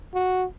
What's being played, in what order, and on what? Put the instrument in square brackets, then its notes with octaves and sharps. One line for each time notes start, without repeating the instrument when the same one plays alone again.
[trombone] F#4